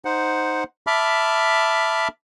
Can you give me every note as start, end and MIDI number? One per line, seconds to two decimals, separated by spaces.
0.05 0.64 63
0.05 0.64 72
0.05 0.64 78
0.87 2.08 76
0.87 2.08 81
0.87 2.08 83
0.87 2.08 86
0.87 2.08 89